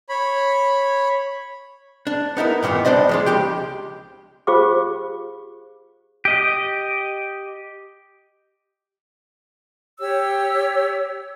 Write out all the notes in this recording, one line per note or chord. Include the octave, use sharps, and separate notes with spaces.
C#5 B5
D4
B3 D#4 E4 A#4
G2 A#2 D#3 A#3 B3
G3 D4 C5 D5 D#5
F3 G#3 D4
C#2 G4 G5
F4 G4 G#4 C5 F5 D6
G4 D#5
G4 C#5 E6